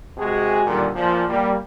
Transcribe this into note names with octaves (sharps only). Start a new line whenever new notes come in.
C3 G#3 F#4 G#4
A#2 D3 D#3 G3
A#2 F3
G3 A#3